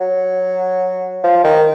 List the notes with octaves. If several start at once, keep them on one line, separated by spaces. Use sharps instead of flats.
F#3
F3
D#3